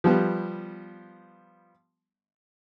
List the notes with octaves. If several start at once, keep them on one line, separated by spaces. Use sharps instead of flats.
F3 G3 B3